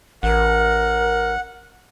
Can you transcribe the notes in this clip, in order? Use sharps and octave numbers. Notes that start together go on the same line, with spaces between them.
A1 A#4 F#5